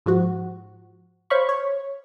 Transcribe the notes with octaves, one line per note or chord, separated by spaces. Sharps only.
G#2 F3 F#4
C5 C#5 F5 B5 C#6
C#5